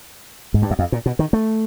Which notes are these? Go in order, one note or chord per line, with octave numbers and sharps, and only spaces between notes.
G#2
G2
F#2
F2
A#2
B2
D#3
A3